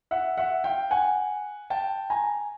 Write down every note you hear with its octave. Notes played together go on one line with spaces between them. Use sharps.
E5 F#5
E5 F#5
F5 G5
F#5 G#5
G5 A5
G#5 A#5